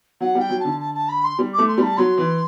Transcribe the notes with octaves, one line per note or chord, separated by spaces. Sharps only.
F#3 F#5
G3 G5
F#3
D3 A5
A5
A5
B5
C6
G3
A3 D6
C6
G3 A5
F#3 C6
E3